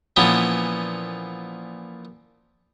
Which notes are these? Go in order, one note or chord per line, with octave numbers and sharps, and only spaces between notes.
A#2 E3 F3 B3 C#4